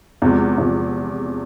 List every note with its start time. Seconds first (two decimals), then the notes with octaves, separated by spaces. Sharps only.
0.22 E2 C3 F3 G#3
0.58 E2 C3 F3 G#3